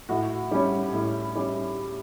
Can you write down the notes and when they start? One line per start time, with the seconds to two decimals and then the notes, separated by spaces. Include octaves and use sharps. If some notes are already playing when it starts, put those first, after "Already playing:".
0.09 A2 F#4
0.51 G3 C#4
0.93 A2
1.35 G3 C#4